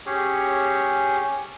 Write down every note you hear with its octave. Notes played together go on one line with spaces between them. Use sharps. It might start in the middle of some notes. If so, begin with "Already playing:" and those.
C#4 G4 G#4 C#5